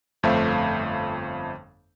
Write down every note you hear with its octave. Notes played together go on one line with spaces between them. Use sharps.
G1 F2 A3 C5 E5 F5